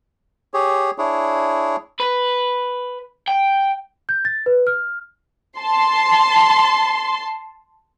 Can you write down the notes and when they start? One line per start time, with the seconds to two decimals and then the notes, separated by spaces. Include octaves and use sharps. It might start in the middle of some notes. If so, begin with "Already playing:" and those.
0.54 G4 G#4 C#5
0.98 D4 E4 G#4 C#5
2.00 B4
3.28 G5
4.09 G6
4.25 A6
4.46 B4
4.67 F6
5.59 A5 C6